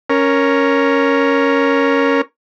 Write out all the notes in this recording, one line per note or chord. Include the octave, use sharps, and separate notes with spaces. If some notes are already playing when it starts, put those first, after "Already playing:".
C#4 A#4